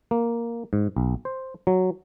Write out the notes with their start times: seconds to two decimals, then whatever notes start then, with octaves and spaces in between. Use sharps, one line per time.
0.11 A#3
0.73 G#2
0.97 B1
1.25 C5
1.67 F#3